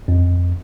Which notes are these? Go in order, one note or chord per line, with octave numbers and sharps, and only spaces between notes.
F2